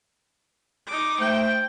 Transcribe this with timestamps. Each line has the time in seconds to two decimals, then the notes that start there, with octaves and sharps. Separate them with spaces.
0.87 D#4 D6
1.20 A3 C5 G5